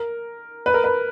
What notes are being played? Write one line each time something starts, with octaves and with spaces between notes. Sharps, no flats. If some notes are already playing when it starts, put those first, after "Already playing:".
Already playing: A#4
B4
A#4
B4